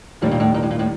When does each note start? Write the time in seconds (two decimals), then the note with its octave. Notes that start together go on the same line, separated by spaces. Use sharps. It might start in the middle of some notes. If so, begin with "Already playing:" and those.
0.21 D#2 A2 D#3 G3 A#3 D4
0.31 A#2
0.40 A2
0.54 A#2
0.63 A2
0.71 A#2
0.79 A2